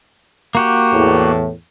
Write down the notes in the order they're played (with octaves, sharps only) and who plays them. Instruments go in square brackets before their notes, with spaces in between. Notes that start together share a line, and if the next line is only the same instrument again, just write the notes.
[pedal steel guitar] A#3 F#4 G4
[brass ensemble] E2 A2